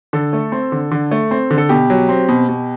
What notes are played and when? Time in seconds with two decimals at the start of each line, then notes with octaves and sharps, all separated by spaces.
0.13 D3 A4
0.33 A3
0.52 C4
0.72 D3
0.91 D3
1.11 A3
1.31 C4
1.51 D3
1.58 A4
1.69 B2 G4
1.90 F#3
2.09 C4
2.28 B2
2.49 B2